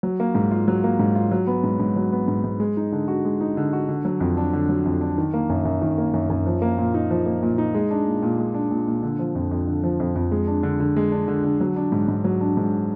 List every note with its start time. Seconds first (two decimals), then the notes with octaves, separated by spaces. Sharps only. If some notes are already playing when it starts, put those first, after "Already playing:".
0.03 F#3
0.20 A#3
0.35 G#2
0.51 F4
0.68 F#3
0.84 A#3
0.99 G#2
1.15 F4
1.32 F#3
1.47 B3
1.64 G#2
1.80 G#2
1.96 F#3
2.12 B3
2.28 G#2
2.44 G#2
2.60 G#3
2.77 D#4
2.92 D3
3.08 F#4
3.25 G#3
3.41 D#4
3.57 D3
3.73 F#4
3.89 D3
4.05 F#3
4.20 F2
4.37 D4
4.53 D3
4.69 F#3
4.85 F2
5.01 D4
5.18 D#3
5.34 A#3
5.50 F#2
5.65 F#2
5.82 D#3
5.98 A#3
6.14 F#2
6.30 F#2
6.46 F3
6.62 A#3
6.78 A#2
6.94 D#4
7.10 F3
7.26 A#3
7.42 A#2
7.58 D#4
7.75 G#3
7.91 D4
8.06 A#2
8.22 A#2
8.38 G#3
8.54 D4
8.71 A#2
8.87 A#2
9.03 D3
9.19 F3
9.35 F2
9.51 F2
9.67 D3
9.84 F3
10.00 F2
10.16 F2
10.32 G#3
10.47 D4
10.63 D3
10.80 D3
10.96 G#3
11.12 D4
11.28 D3
11.44 D3
11.61 F#3
11.76 D4
11.92 G#2
12.08 G#2
12.24 F#3
12.41 D4
12.57 G#2